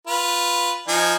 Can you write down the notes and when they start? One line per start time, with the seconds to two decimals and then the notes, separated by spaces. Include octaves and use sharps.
0.07 F4 B4
0.88 F3 D#4 G#5